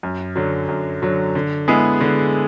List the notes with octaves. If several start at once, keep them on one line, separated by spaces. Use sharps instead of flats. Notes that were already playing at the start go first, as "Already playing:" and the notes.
F#2
D3 F#3
F#2
D3 F#3
D3
G#3 B3 E4 G#4
D3